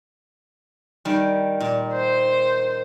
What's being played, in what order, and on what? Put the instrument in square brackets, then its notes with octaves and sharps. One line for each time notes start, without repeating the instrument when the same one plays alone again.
[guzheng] D#3 G3
A#2
[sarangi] C5